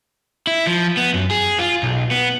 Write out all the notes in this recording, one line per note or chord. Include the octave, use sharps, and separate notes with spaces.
E4
F3
B3
F#2
G#4
F4
B1
B3